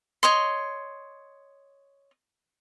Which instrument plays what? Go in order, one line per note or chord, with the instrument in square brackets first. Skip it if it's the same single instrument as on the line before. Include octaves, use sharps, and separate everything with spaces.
[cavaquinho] C#5 D#5 C6